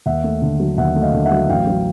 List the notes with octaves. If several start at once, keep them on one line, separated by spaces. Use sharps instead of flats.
D#2 E5 F#5
A3
D3
F#3
D#2 E5 F#5
A3
D#5 F5
D3
E5 F#5
F#3
A1 F5 G5
F#3